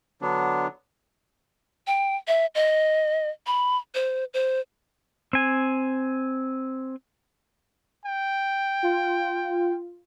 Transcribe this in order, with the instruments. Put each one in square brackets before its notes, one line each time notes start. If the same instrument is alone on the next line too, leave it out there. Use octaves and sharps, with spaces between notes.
[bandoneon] D3 F#3 B3 D4
[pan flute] G5
E5
D#5
B5
C5
C5
[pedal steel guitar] C4 G#5
[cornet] G5
[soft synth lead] F4